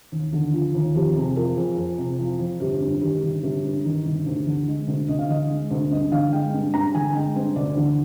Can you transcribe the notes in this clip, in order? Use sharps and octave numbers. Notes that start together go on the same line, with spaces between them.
D#2
D3
F3
D#2
F2 G4
C3 G#4
F3 A#4
F2 G#4
F2
C3
F3
F2
G1 G4
G2
D#3 G4
G1
G1 G4
G2
D#3
G1
D2
D3
G#3
D2
D2 D#5
F5
D3 D#5
G#3
D2
G2 D#5
D3 F5
G#3 G5
G2
G2 A#5
D3 G#5
G#3 G5
G2 C5
D2 D5
D3